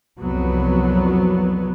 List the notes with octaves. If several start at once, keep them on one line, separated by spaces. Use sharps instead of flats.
C2 F2 F#3 B3